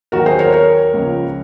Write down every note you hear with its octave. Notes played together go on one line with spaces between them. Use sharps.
D#2 D#3 F#3 F#4 A#4
G#4 C5
A#4 C#5
A#4 C#5
C#2 C#3 F3